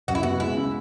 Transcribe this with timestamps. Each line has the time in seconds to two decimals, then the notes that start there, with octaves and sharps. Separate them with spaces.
0.08 F#2 F#4
0.15 E4
0.23 B3 F#4
0.40 G#3 E4
0.57 C#3